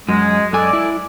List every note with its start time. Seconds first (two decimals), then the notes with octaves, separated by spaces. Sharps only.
0.09 F#2 G#3
0.53 F#2 A4 D5 G#5
0.73 E4